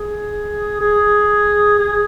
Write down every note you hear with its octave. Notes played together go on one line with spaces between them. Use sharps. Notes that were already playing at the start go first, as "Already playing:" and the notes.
Already playing: G#4
G#4
G#4